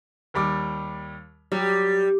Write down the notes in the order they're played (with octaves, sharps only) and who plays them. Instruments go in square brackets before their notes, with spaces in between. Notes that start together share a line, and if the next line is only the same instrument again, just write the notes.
[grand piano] D#2 G3 D6
[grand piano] F#3 [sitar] G3